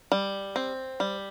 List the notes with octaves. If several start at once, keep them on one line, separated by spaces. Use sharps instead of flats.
G3
C4
G3